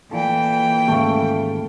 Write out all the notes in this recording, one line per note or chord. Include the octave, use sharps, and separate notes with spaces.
A#2 E3 A4 G5
D#2 G#2 C#3 A3 A4 F5